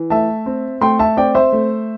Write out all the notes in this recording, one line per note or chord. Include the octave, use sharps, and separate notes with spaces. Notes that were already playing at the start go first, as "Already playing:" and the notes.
Already playing: E3
A3 E5 A5
C4
A3 G5 C6
E5 A5
C4 D5 G5
C5 E5
A3